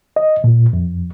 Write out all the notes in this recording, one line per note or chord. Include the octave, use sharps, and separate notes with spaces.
D#5
A#2
F2